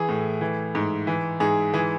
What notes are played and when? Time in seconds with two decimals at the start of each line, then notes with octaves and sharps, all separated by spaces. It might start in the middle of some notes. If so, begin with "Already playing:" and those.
Already playing: E3 G#4
0.09 A2
0.41 E3
0.75 G#2
1.07 E3
1.40 G#2 G#4
1.74 E3 G#4